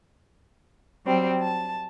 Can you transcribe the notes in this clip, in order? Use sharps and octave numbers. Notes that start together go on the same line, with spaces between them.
F#3 G3 C4
A5